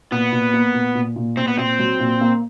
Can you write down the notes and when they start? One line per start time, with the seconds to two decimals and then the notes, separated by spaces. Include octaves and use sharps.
0.11 A#2 B3
0.32 A#2
0.53 A#3
0.74 A#2
0.95 A#2
1.16 A#2
1.37 A#2 C4
1.48 B3
1.58 A#2 C4
1.79 F#3
2.00 A#2
2.21 A#3